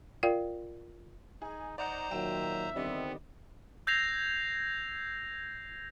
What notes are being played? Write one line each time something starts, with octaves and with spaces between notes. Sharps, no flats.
F4 A#4 D5 F5 G5
D#4 G#4
D#4 C5 D5 F#5 A#5
A#2 D#3 F#3 E5 G5 E7
D3 D#3 G3 B3 C4 D4 D#5
E6 G6 G#6 A#6 C7 F7